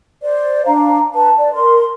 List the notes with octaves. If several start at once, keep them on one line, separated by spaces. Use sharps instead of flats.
C5 D5
D4 F5 A#5
B4 A5
D5
A#4 C6